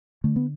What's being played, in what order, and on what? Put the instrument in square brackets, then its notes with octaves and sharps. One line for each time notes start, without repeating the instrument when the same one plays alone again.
[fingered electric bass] D3 A3
B3